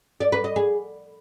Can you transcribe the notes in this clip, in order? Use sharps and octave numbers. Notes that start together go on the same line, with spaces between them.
D5
B4
D#5
G#4